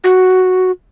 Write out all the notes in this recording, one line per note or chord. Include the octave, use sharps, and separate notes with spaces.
F#4